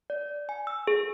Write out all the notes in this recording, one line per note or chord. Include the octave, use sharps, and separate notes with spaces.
D5
G#5
E6
G#4